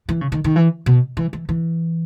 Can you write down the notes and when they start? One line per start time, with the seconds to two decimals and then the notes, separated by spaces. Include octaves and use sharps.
0.09 E3
0.21 C#3
0.32 D#3
0.44 D#3
0.56 E3
0.86 B2
1.17 E3
1.33 E3
1.49 E3